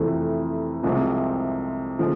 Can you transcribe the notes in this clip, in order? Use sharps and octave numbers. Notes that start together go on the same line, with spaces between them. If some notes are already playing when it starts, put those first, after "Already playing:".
Already playing: F2 C3 E3 A3
C2 C3 F3 G#3 C4
D3 F3 G#3